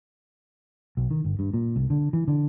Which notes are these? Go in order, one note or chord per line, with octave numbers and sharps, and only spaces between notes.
B1
D#3
G1
G2
A#2
C2
D3
E3
D3